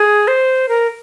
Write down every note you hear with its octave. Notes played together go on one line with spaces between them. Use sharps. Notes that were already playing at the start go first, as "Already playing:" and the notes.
Already playing: G#4
C5
A#4